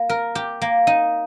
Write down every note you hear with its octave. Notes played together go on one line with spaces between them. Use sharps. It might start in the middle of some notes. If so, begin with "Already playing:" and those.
Already playing: A#3
A#4
G4
A#3
D#4